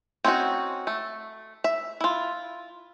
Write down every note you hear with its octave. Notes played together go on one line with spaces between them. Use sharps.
C4 C#4 D#4 E4 F#4
A3
E5
E4 F4